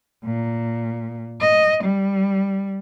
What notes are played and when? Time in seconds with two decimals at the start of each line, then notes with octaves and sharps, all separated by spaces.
0.25 A#2
1.41 D#5
1.84 G3